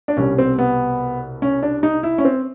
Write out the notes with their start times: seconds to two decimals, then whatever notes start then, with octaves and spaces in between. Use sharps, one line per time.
0.08 D4
0.17 C2 B2 G3 C#4
0.38 C4
0.58 B3
1.42 C#4
1.63 D4
1.83 D#4
2.03 E4
2.18 C#4
2.25 C4